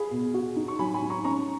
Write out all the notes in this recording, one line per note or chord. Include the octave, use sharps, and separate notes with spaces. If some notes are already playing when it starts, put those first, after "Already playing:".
Already playing: G#4 F5 G#5 B5
B2
F#4
D#4
C#6
F#3 G#5 B5
G#5 B5
D#4
A#5 C#6
C#4 A#5 C#6